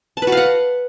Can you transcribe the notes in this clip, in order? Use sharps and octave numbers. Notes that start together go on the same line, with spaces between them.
A5
B4
F#4
F5
F#5